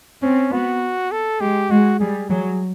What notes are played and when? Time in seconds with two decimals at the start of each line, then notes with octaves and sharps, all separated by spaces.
0.22 C4 C#4
0.51 B3 F#4
1.12 A4
1.40 G#3 G4
1.70 G#3 F#4
2.00 G3 G#4
2.30 F#3 G#4